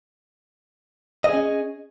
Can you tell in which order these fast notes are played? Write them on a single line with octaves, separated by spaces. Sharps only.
D#5 G#4 C#4